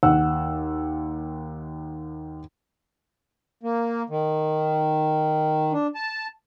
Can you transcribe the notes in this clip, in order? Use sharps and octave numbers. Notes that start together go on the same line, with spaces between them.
D#2 F#5 E6
A#3
D#3
D4
A5